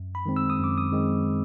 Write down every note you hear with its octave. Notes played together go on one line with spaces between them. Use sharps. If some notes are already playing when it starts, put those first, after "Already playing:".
Already playing: F#2
B5
D#3 G#3 C4
E6
D#6
F#2 D6
D#6
D#3 G#3 C4